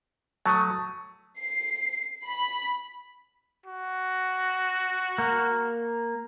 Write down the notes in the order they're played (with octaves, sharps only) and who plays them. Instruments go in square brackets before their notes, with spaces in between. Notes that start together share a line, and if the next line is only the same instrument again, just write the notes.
[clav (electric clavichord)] F#3 A3 [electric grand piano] A5 C#6 D#6
[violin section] C7
B5
[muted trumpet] F#4
[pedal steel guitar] A#3